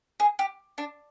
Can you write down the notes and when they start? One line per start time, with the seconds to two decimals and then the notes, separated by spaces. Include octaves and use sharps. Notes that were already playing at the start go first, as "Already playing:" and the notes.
0.20 G#4
0.39 G4
0.78 D4